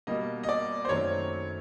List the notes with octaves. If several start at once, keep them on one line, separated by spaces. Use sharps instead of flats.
B2 G3 A#3 D#5
D#5
D5
C5
F#2 D#3 F#3 A3 C4 C#5